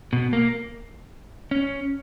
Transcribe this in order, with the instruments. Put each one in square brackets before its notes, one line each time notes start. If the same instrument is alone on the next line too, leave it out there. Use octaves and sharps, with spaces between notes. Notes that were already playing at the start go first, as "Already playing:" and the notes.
[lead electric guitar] B2
A#3
C#4